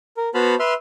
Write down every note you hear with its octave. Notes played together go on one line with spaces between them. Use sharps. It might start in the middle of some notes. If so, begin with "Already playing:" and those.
A#4
B3 F#4 C5 A5 B5 F6
B4 E5 C6 F6